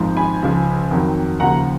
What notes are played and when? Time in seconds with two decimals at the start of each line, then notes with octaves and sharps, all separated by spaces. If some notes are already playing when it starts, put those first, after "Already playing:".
Already playing: G#1 G#2 F3
0.17 G#5 B5
0.42 C#2 C#3 F3
0.91 F2 D#3 F#3
1.40 D#2 C#3 F3 F#5 A#5